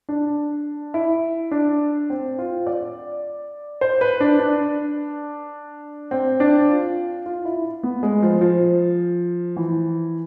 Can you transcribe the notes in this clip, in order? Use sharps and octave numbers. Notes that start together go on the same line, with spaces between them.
D4
E4
D4
C4
F4
D5
C5
B4
D4
D4
C4
D4
F4
F4
E4
B3
G#3
F3
F3
E3